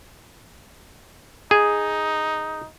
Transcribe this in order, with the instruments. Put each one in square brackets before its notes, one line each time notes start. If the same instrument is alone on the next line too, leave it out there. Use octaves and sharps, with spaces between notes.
[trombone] D#4 [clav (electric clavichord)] G#4